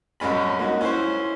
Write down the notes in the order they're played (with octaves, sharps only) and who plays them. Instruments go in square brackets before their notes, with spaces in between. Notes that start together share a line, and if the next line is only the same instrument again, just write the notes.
[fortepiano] C2 F#2 G#3 C#4 B5
A#3 D#4 F#4
C#4 E4 C5